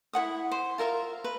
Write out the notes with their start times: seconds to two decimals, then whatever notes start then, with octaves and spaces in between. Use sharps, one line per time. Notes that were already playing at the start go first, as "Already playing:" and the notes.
0.13 E4 C#5 F#5 D#6
0.51 C5
0.78 F4 A#4 E5 F5
1.24 B4